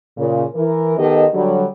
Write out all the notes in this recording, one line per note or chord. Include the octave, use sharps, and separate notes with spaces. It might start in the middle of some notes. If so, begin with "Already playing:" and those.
A#2 C#3
E3 A#4
D#3 B3 G4 A4 D#5
D3 F#3 G3